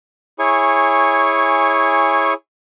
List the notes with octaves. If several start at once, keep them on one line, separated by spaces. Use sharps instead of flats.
E4 G#4 C#5 G#5 C#6